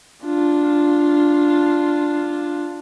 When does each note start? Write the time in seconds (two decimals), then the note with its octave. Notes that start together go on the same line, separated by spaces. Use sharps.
0.24 D4 F4